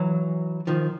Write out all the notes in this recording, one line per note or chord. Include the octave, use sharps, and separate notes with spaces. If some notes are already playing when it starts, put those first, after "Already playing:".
Already playing: E3 F#3
D#3 F3